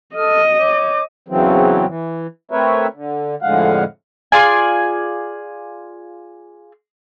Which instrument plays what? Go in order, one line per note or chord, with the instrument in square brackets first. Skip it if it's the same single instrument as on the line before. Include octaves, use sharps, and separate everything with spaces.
[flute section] A4 D#6 F6 [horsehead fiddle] D#5
[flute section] C#5 D6 G6
[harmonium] E2 C#3 E3 F#3 C4
E3
A3 C4 A#4 B4 C#5 E5
D3
F2 A2 D3 G#3 F5 F#5
[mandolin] F4 G#4 D5 G#5